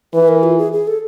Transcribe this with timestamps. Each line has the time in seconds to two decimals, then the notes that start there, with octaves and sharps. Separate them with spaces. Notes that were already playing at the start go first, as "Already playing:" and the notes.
0.14 E3 B4
0.28 A#4
0.43 F4
0.58 G#4
0.73 G#4
0.87 A4